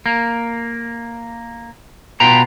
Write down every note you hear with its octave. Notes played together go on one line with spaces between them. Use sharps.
A#3
B2 F4 B4 G5 A#5